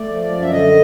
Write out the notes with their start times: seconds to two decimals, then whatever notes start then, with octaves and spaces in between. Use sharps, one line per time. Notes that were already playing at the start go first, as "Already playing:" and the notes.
Already playing: A3 D5
0.08 F3
0.30 F#2
0.41 E5
0.52 D3 D#5